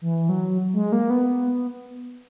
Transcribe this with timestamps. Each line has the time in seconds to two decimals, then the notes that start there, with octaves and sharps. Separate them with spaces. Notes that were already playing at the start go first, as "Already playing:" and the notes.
0.01 E3
0.29 F#3
0.73 G#3
0.92 A#3
1.10 B3